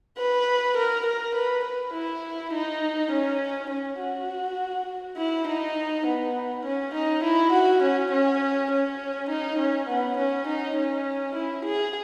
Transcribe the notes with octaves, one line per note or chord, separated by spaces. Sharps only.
B4
A#4
A#4
B4
B4
E4
D#4
C#4
C#4
F#4
E4
D#4
B3
C#4
D#4
E4
F#4
C#4
C#4
C#4
D#4
C#4
B3
C#4
D#4
C#4
E4
G#4